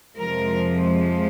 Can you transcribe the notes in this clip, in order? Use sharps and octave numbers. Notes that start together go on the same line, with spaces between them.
F2 C3 F3 G#3 A#4